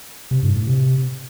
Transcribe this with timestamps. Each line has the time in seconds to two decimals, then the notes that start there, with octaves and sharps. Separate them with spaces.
0.31 C3
0.43 G2
0.55 A2
0.67 C3